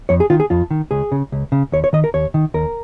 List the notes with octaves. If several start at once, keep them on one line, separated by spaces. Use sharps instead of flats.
F2 C#5
G#4
D#3 F4
G#4
F2 F4
D#3
C#2 G#4
C#3
C#2
C#3
D#2 C#5
C#5
D#3 D#5
A#4
D#2 C#5
D#3
D#2 A#4